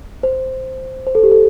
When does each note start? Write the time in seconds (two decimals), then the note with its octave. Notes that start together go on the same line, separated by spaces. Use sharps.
0.23 C5
1.07 C5
1.15 A4
1.23 G4
1.32 A4